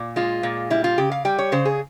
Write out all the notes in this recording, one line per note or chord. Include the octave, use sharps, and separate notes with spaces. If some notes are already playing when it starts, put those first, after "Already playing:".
Already playing: A#2
G#3 F4
A#2
G3 E4
F4
C#3 G4
F5
G3 G5
C#5
C#3 C5
G#4